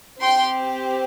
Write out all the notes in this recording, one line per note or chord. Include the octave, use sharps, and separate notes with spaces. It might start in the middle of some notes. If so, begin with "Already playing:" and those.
C4 G4 G5 C6